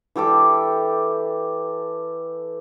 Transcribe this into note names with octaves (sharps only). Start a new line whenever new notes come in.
E3 G4 A4 D6